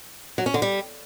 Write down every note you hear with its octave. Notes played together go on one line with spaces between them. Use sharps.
F#3
C#4
D3
G3